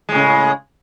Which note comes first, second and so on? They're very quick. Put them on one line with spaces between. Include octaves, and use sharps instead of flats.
G#3 A2 C#3